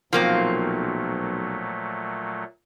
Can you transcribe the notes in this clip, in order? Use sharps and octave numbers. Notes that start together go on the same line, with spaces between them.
B1 A#2 F3 F#3 A3 A#3 C4